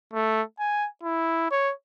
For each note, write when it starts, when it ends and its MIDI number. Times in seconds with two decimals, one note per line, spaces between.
0.13 0.42 57
0.59 0.87 80
1.03 1.48 64
1.51 1.72 73